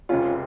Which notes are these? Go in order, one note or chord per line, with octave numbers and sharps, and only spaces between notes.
F1 F2 C#3 G#3 C#4 F4